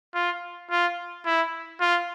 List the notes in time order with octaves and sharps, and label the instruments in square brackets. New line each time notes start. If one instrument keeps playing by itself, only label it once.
[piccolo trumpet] F4
F4
E4
F4